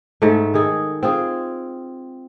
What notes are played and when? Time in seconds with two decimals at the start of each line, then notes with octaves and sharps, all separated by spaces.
0.22 G#2 A3
0.54 D#3 G#3 G#4 A4
1.03 C4 F4 G#4